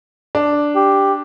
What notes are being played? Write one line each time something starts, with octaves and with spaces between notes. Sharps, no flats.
D4
G4